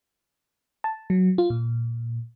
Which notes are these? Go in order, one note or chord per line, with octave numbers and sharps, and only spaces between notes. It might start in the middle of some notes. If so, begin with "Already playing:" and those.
A5
F#3
F4
A#2